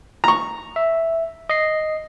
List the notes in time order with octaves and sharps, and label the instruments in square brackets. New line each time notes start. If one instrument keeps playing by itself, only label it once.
[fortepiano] A#5 C#6
[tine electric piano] E5
D#5 C7